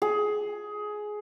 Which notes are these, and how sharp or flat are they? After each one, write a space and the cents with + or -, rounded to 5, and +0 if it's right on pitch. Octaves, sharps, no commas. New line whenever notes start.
G#4 +15